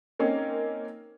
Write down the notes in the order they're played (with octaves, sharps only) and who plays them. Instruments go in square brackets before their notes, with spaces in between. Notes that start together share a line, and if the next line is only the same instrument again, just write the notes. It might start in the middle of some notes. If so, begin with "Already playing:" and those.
[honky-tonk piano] A#3 C4 C#4 D#4